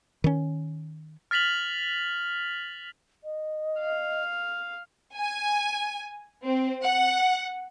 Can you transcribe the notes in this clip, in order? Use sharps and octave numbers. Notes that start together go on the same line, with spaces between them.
D#3 C#4
F6 A6 B6 F7 F#7
D#5
F5
G#5
C4
F#5